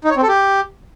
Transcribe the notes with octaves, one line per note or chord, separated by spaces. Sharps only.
D#4
C#5
C4
A4
G4